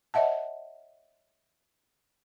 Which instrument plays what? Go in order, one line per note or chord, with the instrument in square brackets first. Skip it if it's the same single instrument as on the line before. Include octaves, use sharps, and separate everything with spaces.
[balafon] C#5 D#5 E5 F#5 A5